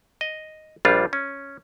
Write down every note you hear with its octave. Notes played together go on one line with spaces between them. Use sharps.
D#5
A#1 G3 D4 F4
C#4